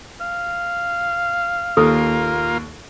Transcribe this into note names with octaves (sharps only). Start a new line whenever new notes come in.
F5
D#2 A#3 F4 A4